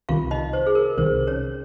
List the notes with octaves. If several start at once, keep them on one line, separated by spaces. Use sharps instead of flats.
C2 C3 D#3 F4 F5
D#4 D#5
C5
G#4
A#4
C2 C3 D#3 C5
C#4 C#5